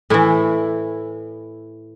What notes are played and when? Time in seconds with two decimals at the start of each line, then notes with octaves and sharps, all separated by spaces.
0.10 A2 E3 E4